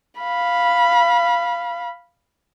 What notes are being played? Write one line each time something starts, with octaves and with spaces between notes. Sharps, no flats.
F5 B5